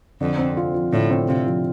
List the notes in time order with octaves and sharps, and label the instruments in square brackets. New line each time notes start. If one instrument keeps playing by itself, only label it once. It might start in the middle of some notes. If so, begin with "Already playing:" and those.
[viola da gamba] F2 [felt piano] D3
[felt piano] C4
F4
F3
[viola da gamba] A2 [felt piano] D3
[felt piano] C4
[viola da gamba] C3 [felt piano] F4
[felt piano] F3